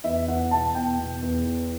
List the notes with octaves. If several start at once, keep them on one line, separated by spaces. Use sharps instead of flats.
E2 E5
E2 F#5
B2 A5
E2 G5
B2
E2
E3